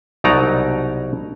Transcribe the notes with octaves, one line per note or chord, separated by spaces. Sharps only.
C2 B2 F#3 D#4 D5 A#5